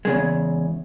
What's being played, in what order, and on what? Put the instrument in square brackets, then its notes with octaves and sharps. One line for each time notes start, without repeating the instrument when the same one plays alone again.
[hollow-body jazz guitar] E2 C#3 G#3